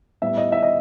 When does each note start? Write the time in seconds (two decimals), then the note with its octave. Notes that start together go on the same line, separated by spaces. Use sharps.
0.22 A2 G3 B3 E5
0.37 D#5
0.52 E5
0.62 D#5